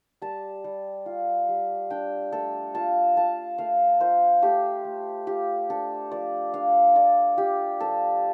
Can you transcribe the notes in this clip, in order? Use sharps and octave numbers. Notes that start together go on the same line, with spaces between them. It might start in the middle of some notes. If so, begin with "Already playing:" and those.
G3 A5
G3
F4
G3
D4 G5
A3 A4
F4 A5
F4 A5
A3 F5
F4 C5
A3 G4
A3
F4 G4
D4 A4
F3 D5
D4 F5
A3 D5
F4 G4
F3 A4